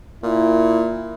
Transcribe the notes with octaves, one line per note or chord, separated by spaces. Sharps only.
A#2 E4